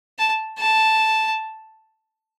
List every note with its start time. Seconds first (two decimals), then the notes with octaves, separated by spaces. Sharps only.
0.19 A5
0.59 A5